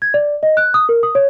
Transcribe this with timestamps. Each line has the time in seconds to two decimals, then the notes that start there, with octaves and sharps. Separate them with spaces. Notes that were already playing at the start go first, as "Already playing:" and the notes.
0.02 G#6
0.14 D5
0.43 D#5
0.57 F#6
0.74 D#6
0.89 A#4
1.03 D#6
1.15 C#5